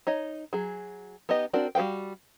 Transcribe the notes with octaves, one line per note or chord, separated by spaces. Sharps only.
D#4 C#5 D#5
F#3 G#4
B3 D#4 G4 D#5
C4 D4 F#4 A#4 D5
G3 F#4 B4 F5 G5